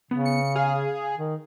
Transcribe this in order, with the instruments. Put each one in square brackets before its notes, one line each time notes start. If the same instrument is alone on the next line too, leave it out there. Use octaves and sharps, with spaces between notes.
[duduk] C#3 [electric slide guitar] B3
[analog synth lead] C#7
[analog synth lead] G#4 [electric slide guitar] F5
[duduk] D#3